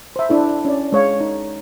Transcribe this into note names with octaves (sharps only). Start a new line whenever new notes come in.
C5 E5
D4 E4 A4
C#4 D5
G#3 C#5 F5
D#4